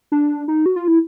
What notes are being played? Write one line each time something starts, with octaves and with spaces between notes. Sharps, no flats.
D4
D#4
F#4
F4
E4